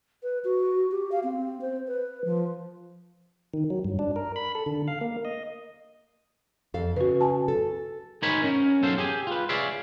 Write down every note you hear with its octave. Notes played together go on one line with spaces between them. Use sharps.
B4
F#4
G4
F5
C4
C5
B4
F3
D#3
F#3
G2
D4
A#4
B5
A4
D3
F5
A#3
D#5
F2 A4 F5
C#3 F#4 B4
G#5 A5
A4
D#4 A#4 C5 C#5 G#5 B5
C#4 A#4
B1 F#2 F#3 A4 C5 F5
G4 G#4 G#5
F4 B4
G#4 C#5 D5 E5 F5